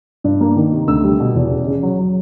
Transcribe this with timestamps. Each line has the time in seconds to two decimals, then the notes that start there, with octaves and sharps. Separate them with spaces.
0.24 G2
0.41 A#3
0.56 D#3
0.72 C3
0.88 D2 E6
1.04 G3
1.20 B2
1.35 E2
1.51 C#3
1.67 C#3
1.83 F#3
1.99 F#3